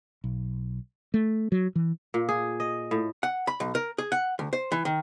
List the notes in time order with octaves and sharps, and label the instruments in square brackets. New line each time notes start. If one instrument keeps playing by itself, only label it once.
[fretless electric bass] B1
A3
F#3
E3
[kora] A#2
G#4
D#5
A2
[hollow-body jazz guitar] F#5
B5
B1
A#4
G#4
F#5
D2
C5
E3
D#3